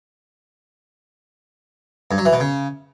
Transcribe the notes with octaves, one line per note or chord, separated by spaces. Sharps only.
G2
F#3
E3
B2
C#3